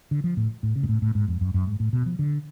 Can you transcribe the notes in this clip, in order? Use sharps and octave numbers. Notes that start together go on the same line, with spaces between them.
D3
F3
A2
A2
C#3
G#2
A2
A2
G#2
F2
F#2
F#2
G#2
A2
B2
F3
D3